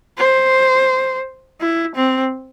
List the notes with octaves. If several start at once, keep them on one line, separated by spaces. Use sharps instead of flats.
C5
E4
C4